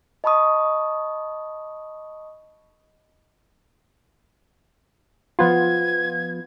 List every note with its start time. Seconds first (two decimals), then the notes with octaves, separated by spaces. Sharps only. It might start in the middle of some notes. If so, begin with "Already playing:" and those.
0.24 D#5 A5 B5 C#6 D#6
5.39 F3 B3 F4 G#6